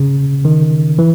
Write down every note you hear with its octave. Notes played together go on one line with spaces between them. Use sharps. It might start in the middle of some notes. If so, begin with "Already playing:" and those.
Already playing: C#3
D#3
E3